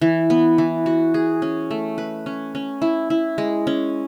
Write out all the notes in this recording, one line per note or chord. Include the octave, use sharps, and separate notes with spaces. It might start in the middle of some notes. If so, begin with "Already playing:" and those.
E3
B3
E3
F#4
G#4
C#4
A3
B4
C#4
C#4
E4
E4
G#3
C#4